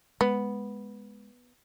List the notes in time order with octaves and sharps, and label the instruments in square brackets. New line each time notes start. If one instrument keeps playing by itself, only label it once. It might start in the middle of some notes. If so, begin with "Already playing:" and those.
[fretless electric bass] G#3 [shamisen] B3